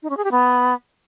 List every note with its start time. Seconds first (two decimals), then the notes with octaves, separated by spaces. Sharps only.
0.03 D#4
0.10 C#4
0.17 G#4
0.24 G4
0.31 B3